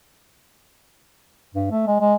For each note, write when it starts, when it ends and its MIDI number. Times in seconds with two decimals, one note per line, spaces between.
1.54 1.67 43
1.71 1.83 57
1.87 2.00 56
2.00 2.15 56